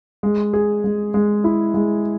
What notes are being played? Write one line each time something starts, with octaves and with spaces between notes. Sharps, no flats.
G#3
G#4
G#3
G#3
E4
G#3